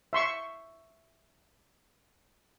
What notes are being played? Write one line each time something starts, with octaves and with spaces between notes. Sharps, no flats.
E5 C6 C#6